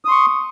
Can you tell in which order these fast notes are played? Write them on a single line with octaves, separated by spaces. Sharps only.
D#6 C6 C#6